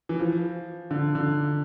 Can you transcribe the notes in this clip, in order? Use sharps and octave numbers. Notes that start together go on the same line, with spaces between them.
E3
F3
D3
D3